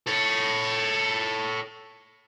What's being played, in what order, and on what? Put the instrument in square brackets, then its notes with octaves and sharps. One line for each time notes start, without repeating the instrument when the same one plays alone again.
[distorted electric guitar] A4 C#5